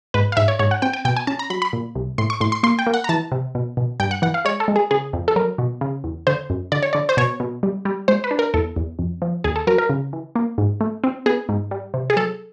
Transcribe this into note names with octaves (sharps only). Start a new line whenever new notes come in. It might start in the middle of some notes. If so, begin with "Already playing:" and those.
G#2 B4
F5
G#2 E5
C#5
G#2 C#5
F#5
C4 G5
G5
B2 G5
G#5
C#4 A5
A#5
F#3 B5
B5
A#2
C2
A2 C6
C#6
A2 C6
C6
A#3 C6
G5
A#3
F#5
A#5
E3 A5
C3
B2
B2
G2 G5
F#5
E3 F#5
F5
G#3 C#5
A4
G#3
G#4
C#3 G#4
F2
A4
F#3 A#4
B2
C#3
E2
D3 C5
F#2
D3 D5
C#5
D3 D5
C5
B2 C#5
B2
G3
G3
G#3 C5
B4
D4
A#4
E2 A4
E2
F2
F3
D#2 G#4
A4
F#3 A#4
A#4
C#3
E3
A#3
G#2
A3
C4
B3 G#4
G#2
G3
C3
G#4
F#3 A4